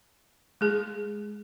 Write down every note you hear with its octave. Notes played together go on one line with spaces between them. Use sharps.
G#3 G#4